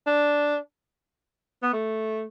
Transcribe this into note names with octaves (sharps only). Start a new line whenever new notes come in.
D4
B3
A3